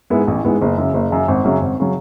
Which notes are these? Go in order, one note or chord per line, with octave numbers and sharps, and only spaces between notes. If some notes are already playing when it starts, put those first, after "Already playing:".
G#2 G#3 B3 E4
A1
G#2 G#3 B3 E4
F#1
F#2 C#3
F#1
F#2 C#3
G#1
F#2 C#3 F#3
G#1
C#3 F#3